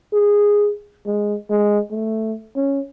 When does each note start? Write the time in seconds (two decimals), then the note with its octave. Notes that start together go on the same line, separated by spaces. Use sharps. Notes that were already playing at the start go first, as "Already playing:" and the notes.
0.13 G#4
1.07 G#3
1.50 G#3
1.91 A3
2.56 C#4